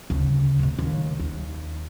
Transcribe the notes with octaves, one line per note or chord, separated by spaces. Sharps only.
D2 C#3
D1 C3
F1 D#2
D#2